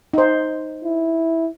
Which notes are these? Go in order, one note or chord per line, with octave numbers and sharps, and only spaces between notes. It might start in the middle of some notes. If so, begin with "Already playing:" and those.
D#4 C5
E4